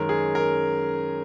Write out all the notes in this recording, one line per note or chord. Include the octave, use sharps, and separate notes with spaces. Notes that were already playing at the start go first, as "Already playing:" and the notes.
Already playing: F#2 D#3 G#3 C#4 A#4
G#4
A#4